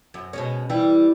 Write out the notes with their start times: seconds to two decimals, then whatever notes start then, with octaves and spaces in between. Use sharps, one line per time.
0.14 F#2
0.33 B2 G#3 C#4
0.69 E3 G3 E4